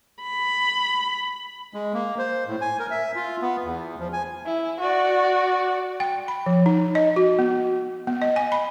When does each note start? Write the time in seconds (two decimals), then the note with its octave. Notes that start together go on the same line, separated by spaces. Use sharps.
0.22 B5
1.74 G#3
1.94 A#3
2.18 C5
2.48 A2
2.61 G#5
2.79 A#4
2.91 E5
3.15 F4
3.42 B3
3.64 E2
3.99 F3
4.13 G#5
4.45 E4
4.80 F#4 D5
6.00 G5
6.28 B5
6.46 F3
6.66 D#4
6.95 D#5
7.16 F#4
7.39 B3
8.07 B3
8.22 D#5
8.36 G#5
8.52 B5